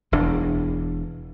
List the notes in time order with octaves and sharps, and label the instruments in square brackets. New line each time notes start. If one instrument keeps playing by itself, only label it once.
[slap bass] E1 E2 E3 D4